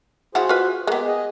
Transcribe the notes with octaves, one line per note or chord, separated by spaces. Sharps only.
F3 E4 F#4 G#4 C5 F#5
F4 B4
G#3 B3 G4 A#4
G#4 D#5